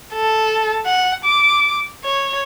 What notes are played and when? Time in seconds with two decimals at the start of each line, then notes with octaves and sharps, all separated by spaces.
0.14 A4
0.86 F#5
1.25 D6
2.04 C#5